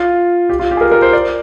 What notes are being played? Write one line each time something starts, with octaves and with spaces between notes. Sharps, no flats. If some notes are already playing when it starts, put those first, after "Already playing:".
Already playing: F4
G4
F4
G4
G#4
A#4
A#4
C5
D5